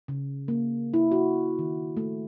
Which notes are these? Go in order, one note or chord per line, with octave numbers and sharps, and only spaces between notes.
C#3
A#3
E4
F#4
D#3
A3